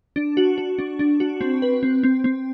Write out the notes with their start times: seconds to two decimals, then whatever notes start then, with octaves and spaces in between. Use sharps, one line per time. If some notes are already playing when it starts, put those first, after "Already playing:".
0.16 D4
0.37 F#4
0.58 F#4
0.79 D4
0.99 D4
1.20 F#4
1.41 C4
1.62 B4
1.83 C4
2.03 C4
2.24 C4